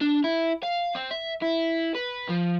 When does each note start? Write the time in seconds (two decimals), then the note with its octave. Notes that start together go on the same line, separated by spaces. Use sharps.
0.01 D4
0.24 E4
0.63 F5
0.95 C4
1.11 E5
1.42 E4
1.96 B4
2.30 F3